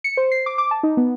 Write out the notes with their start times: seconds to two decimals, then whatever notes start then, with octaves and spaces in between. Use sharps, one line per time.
0.04 C#7
0.17 C5
0.31 C7
0.46 D6
0.58 D6
0.71 A5
0.83 D#4
0.97 B3